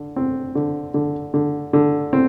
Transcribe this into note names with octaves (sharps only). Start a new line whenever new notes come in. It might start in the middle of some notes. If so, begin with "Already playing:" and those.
Already playing: D3
C4
D3
D3
D3
D3
C4